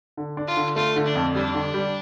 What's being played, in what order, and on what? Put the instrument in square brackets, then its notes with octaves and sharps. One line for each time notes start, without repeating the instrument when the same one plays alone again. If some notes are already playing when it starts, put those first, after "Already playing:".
[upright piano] D3
D4
[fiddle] F4
[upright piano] D3
[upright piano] A3 [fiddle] F4
[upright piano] D3
[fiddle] D4
[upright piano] F2
[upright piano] G3 [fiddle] D4
[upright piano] D3
G3